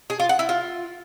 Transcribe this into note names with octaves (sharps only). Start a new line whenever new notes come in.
G#4
F4
F#5
E4
F4